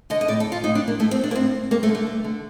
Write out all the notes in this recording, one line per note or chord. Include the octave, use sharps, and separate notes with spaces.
D3 D#5
D#5
A2 D5
A4
F4
A2 D#4
D4
A#3
A2 A3
C4
D4
A#3
A2 C4
G2 A#3
A3
D3
A3
G2
D3